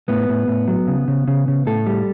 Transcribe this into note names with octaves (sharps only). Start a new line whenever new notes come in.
A2 B3
A2
A2
F#3
C#3
C#3
C#3
C#3
A2 A4
G3